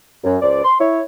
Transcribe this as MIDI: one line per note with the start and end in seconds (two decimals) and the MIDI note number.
0.24 0.36 42
0.41 0.63 37
0.41 0.63 72
0.41 0.63 74
0.63 0.75 84
0.79 1.00 64
0.79 1.00 73